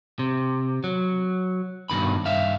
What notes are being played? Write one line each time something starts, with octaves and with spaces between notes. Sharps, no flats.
C3
F#3
G2 B2 D#3 B5
G2 E5 F5